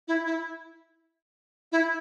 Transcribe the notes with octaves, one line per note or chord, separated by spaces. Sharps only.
E4
E4
E4